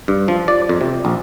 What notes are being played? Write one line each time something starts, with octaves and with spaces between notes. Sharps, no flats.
G2
F3
D5
F2
C3
A#1